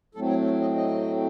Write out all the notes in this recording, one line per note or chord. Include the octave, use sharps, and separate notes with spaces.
A2 F#3 A3 C4 A4
C#5
C#5
D#5
D#5